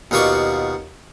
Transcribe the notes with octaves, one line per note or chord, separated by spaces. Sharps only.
D#2 B2 F4 F#4 D5 C#6